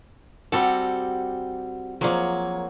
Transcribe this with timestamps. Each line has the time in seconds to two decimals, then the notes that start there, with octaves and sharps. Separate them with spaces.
0.52 G3 C4 F#4 G4 A4 F#5
2.01 F3 F#3 A#3 G#4 C#5